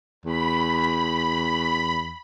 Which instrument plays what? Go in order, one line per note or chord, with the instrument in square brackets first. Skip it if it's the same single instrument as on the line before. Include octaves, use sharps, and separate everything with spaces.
[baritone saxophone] E2 [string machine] B5